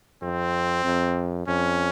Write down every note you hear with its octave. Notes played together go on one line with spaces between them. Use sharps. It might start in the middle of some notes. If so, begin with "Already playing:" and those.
F2 C4
F2
F2 C#4